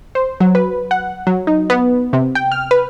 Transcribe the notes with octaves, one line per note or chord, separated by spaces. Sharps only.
C5
F#3
B4
F#5
F#3
D#4
B3
C3
G5
F6
B4